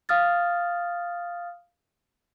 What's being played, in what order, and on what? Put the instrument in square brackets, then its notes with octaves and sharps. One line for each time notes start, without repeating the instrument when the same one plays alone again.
[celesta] F5 D#6 F6 A6